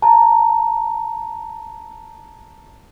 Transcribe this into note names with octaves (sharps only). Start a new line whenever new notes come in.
A5 A#5